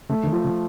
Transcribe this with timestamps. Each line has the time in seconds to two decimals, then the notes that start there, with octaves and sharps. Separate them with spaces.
0.09 C#3 A3
0.23 D3
0.27 D#3
0.32 F3
0.44 C#3